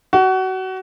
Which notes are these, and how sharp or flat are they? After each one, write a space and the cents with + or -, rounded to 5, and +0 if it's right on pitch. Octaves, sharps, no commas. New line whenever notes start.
F#4 +25